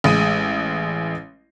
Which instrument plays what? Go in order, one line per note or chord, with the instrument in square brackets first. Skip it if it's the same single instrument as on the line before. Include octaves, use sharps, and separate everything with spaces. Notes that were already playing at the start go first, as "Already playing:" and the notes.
[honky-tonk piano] A1 G#3 D#6 D#7